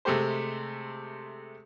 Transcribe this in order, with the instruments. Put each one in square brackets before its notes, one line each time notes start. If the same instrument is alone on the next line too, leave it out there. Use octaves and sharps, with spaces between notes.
[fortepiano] C3 G#3 A3 C4 G4 C5